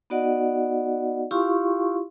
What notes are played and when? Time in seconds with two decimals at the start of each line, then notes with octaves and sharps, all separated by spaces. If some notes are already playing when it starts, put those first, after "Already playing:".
0.10 B3 D#4 F#4 D5 D#5 F#5
1.31 E4 F4 G4 F5 C6 C#6